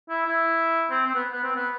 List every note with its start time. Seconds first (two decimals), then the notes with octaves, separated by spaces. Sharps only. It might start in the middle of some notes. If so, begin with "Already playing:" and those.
0.09 E4
0.26 E4
0.90 C4
1.07 C4
1.15 B3
1.32 B3
1.43 C4
1.56 B3